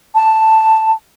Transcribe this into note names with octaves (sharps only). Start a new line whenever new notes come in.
A5